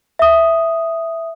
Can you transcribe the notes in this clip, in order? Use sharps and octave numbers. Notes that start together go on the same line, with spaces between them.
E5 D#6